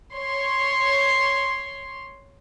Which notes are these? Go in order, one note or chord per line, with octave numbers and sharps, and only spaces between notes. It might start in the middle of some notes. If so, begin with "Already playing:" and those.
C#5 C6